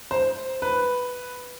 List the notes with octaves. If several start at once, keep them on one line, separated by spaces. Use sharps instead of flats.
C5
B4